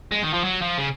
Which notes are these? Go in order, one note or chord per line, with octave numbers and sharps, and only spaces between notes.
G#3
D#3
F3
F#3
F3
C#3